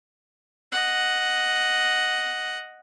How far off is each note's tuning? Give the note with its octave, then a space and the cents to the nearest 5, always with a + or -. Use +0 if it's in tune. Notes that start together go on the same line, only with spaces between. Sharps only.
D#5 +0 F#5 +0